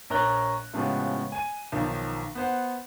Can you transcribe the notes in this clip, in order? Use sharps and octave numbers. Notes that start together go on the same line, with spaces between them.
A#1 A#4 C#5 A#5 F#6 G7
A2 C#3 F3 G#3 B3 G4
G#5 D#7
B1 D#3 F3
B3 C5 F#5